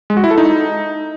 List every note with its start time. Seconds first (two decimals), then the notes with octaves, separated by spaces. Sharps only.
0.10 G#3
0.17 F#4
0.24 E4
0.31 A4
0.38 D#4